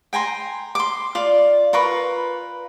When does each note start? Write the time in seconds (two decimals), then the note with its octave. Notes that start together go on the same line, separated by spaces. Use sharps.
0.13 G5 G#5 A#5 C6
0.75 C6 D6
1.15 F4 D5
1.73 F4 A#4 B4 C#6